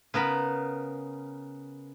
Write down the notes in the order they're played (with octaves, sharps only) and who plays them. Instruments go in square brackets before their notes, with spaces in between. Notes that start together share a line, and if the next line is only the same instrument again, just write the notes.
[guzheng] C#3 B3 A#4 B5